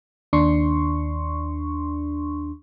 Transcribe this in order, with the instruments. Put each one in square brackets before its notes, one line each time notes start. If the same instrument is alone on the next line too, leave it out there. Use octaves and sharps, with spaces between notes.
[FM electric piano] D#2 D4 C6 C#6